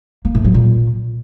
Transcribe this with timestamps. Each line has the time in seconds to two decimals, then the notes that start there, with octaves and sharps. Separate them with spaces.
0.25 A#3
0.35 A2
0.44 F#3
0.54 A#2